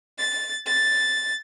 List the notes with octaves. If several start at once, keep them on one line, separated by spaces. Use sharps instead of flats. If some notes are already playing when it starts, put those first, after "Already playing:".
A6
A6